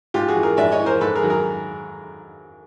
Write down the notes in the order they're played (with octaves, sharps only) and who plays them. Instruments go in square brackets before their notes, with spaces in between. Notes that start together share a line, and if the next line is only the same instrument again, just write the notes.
[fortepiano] G#2 F4 G4
F#4 G#4
E3
G#4 A#4
G#2 D5 E5
C#5 D#5
E3
A#4 C5
G#2 A4 B4
G#4 A#4
D#3 F#3
G#4 A#4